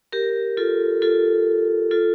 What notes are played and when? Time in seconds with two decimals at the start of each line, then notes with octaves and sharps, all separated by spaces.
0.12 G4 A#4
0.57 F4 A4
1.02 F4 A4
1.91 F4 A4